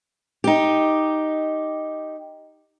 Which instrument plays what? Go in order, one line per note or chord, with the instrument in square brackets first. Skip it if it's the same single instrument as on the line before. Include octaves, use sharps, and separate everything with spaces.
[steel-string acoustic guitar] D#4 G4